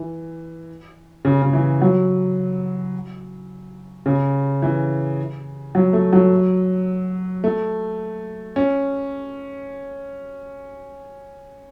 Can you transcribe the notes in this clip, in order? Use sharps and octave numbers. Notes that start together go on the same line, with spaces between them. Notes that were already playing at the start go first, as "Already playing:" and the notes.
Already playing: E3
C#3
C#3
E3
F#3
C#3
E3
F#3
A3
F#3
A3
C#4